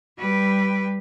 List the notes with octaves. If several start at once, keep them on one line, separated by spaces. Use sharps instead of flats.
G3 B4